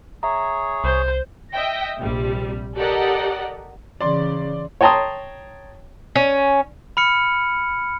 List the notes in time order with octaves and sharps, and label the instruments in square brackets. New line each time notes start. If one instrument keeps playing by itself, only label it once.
[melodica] G#4 C#5 [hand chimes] E5 A#5
[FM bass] C2 [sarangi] C5
[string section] D#5 E5 G5 A#6
A#1 C3 G3
G4 A4 A#4 D5 D#5 F#5
[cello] C#3 E3 [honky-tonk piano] D5 C6
[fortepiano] C#5 G5 A5 A#5 C6 D#6
[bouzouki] C#4
[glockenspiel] B5 F6 C#7